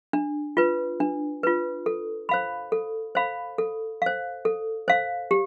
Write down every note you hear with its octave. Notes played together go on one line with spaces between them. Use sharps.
D4
F4 B4
D4
F4 B4
A4
C5 F5 B5
A4
C5 F5 B5
A4
C5 F5
A4
C5 F5
G4